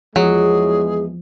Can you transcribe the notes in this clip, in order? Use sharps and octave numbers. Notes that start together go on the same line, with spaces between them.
E2 F3 F#3 G#3 G#4